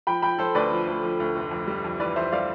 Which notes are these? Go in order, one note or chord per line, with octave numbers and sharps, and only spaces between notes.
F3 G5 B5
F3 G5 B5
F3 A4 C5
D2 B4 D5
F3
D2
F3
D2
F1
F2
G3
F2
E3 B4 D5
F2 C5 E5
G3 D5 F5